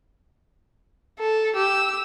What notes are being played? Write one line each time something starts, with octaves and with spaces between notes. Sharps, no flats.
A4
G4 E6